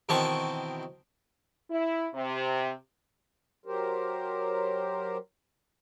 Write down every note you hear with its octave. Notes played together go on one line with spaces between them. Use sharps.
B2 D#3 E3 C4 A5 C#6
E4
C3
F#3 G4 A#4 C5